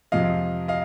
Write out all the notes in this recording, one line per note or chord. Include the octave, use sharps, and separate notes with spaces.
F2 C3 F3 G#3 D#5 F5
D#5 F5